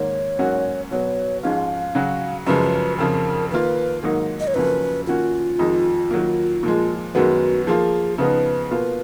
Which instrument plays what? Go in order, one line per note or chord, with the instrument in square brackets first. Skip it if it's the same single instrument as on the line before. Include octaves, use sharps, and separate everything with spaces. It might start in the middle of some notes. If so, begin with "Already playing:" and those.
Already playing: [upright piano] G#2 D#3 A#3 [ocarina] C#5
[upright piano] G#2 F#3 A#3 C#4 F#4
[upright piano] B2 F#3 B3 [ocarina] C#5
[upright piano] G#2 F3 G#3 C#4 F4 [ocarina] F5
[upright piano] C#3 F#3 C#4 F#4
[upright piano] F#2 C#3 F3 G#3 [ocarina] B4
[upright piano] F2 C#3 F3 [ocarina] A#4
[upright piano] D#3 A#3 F4 [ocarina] B4
[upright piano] G#2 D#3 F#3 A#3 D#4
[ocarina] D#5
C#5
[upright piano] F#2 C#3 F3 A#3 C#4 [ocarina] B4
[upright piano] D#3 A#3 C#4 F#4 [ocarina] F4
[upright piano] F2 D#3 G#3 D#4
D#3 F#3 A#3
A#2 F3 G#3
[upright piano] F#2 D#3 G#3 B3 [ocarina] F#4
[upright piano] F3 A#3 F4 [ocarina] G#4
[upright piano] C#3 F3 B3 D#4 [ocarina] B4
[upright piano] B2 A#3 F4